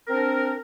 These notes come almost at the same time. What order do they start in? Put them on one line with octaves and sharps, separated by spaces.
A#4 C4 D4